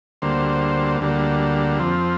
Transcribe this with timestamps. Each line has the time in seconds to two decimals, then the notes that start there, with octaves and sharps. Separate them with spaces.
0.22 D2 D3 G3 A#3 C5
1.01 D2 D3 G3 A#3
1.79 F2 F3 C4